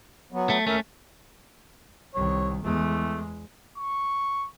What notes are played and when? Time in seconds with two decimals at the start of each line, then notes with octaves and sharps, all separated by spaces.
0.32 F#3 B3
0.50 A3
0.67 D#2 A3 C#4 A#4 E5
2.14 C2 D#3 C#5
2.63 E2 G#3 A3
3.78 C#6